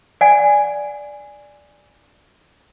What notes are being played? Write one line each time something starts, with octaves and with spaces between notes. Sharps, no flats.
D5 F#5 G#5